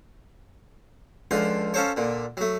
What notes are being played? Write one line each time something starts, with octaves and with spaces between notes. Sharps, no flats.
C#2 D3 F3 C6
C#4 F4 A4 C5 C#5
A#2 D3
F#3 A3